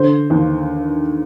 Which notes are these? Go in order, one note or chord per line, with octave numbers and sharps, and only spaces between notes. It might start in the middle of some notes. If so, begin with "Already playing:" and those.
Already playing: D3 C5
D#2